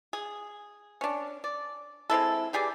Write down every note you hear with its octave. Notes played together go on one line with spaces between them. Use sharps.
G#4
C#4 D4
D5
G#3 C4 E4 A4
E3 G4 G#4 D5